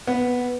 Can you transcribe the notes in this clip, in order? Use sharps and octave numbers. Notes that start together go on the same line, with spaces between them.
B3